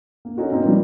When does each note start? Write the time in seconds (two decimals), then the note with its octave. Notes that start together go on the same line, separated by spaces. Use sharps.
0.25 A#3
0.37 C#4 D#4 F#4 A4
0.52 A#3 C4 D#4 B4
0.64 A#2 F3 G3 A#4